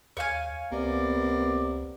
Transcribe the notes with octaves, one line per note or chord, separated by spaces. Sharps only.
D#2 C#5 F5 G#5
C#2 C3 A#3 B3 D5